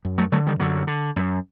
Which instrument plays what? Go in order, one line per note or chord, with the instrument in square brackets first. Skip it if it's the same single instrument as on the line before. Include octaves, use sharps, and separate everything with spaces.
[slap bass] F#2
F#3 A3
D3 F#3 A3
D#3 G3
F#2 D3 F#3
D3
F#2